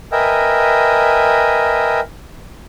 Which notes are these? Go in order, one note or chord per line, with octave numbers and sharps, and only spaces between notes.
A#4 B4 D#5 E5 G5 G#5